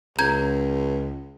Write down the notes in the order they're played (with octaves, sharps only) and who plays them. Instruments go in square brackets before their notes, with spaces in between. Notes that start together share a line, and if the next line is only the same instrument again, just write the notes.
[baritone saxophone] C#2 [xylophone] A#5 G6 G#6